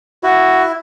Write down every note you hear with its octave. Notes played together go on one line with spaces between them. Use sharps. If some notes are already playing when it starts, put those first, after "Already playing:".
E4 F#4